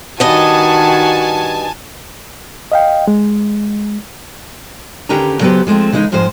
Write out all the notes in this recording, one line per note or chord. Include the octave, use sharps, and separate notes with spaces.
G2 D#3 F#4 D#5 G#5 A5
D#5 F5 G5
G#3
D#2 D3 C#4 G4 B4 A#5
C#3 F#3 B3 G4 B4 C5
F3 G#3 A3 C4
C#3 E3 G#3 B3 D#4
F2 G#2 F3 G#3 C5